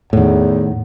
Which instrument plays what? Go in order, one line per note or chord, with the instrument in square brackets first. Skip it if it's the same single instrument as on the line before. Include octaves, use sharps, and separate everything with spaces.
[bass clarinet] E2 [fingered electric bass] A2 D#3